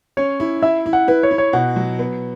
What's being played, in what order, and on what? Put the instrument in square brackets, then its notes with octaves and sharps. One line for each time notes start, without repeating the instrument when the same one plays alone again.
[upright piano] C#4 [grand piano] C#5
[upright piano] E4
[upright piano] E4 [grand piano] E5
[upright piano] E4
[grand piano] F#5
[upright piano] E4 [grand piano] B4
[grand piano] C#5
[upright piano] E4
[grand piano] C#5
[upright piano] B2 [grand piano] F#5
[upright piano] F#3
B3